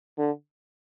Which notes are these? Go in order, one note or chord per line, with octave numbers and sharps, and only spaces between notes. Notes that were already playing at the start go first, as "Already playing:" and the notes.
D3